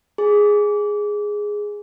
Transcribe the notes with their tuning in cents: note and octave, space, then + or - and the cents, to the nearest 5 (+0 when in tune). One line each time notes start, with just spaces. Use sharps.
G#4 +0